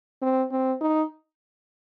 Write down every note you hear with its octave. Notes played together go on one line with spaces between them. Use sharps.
C4
C4
D#4